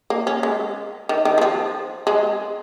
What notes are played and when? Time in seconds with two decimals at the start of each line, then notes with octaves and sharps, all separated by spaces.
0.10 A#3
0.27 C#4
0.43 G#3
1.09 D#3
1.25 D#3
1.38 G#3
1.41 F3
2.07 G#3